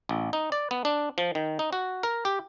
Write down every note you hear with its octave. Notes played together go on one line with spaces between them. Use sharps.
A1
D#4
D5
B3
D4
F3
D#3
D#4
F#4
A#4
G4